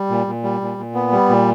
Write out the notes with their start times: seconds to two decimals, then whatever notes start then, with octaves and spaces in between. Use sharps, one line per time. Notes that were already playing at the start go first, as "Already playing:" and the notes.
Already playing: G3
0.10 A#2
0.27 A#2
0.44 G3
0.61 A#2
0.78 A#2
0.94 B3
1.12 G3
1.29 A#2